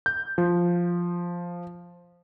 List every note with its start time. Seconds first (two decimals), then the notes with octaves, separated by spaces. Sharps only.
0.06 G6
0.38 F3